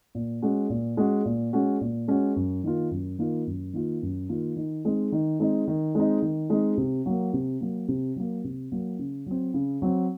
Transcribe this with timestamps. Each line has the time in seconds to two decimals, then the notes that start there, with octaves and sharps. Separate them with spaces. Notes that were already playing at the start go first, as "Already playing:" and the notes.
0.15 A#2
0.42 G#3 C#4 F#4
0.70 A#2
0.97 G#3 C#4 F#4
1.25 A#2
1.53 G#3 C#4 F#4
1.81 A#2
2.08 G#3 C#4 F#4
2.36 F#2
2.64 D#3 A#3 F4
2.91 F#2
3.19 D#3 A#3 F4
3.47 F#2
3.73 D#3 A#3 F4
4.02 F#2
4.29 D#3 A#3 F4
4.56 D#3
4.85 G#3 C4 D#4
5.12 D#3
5.40 G#3 C4 D#4
5.68 D#3
5.95 G#3 C4 D#4
6.22 D#3
6.50 G#3 C4 D#4
6.77 C3
7.06 F#3 A#3
7.33 C3
7.61 F#3 A#3
7.88 C3
8.16 F#3 A#3
8.44 C3
8.72 F#3 A#3
8.99 C#3
9.26 F#3 C4
9.54 C#3
9.82 F#3 C4